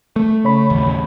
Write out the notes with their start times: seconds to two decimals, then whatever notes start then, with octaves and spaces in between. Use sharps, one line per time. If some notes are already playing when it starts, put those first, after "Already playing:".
0.16 A3
0.44 C#3 C#5 B5
0.70 A1 D#2